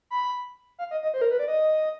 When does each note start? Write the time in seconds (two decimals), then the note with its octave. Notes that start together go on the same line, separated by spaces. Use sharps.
0.10 B5
0.79 F5
0.91 D#5
1.03 D#5
1.14 C5
1.21 A#4
1.31 B4
1.39 D5
1.48 D#5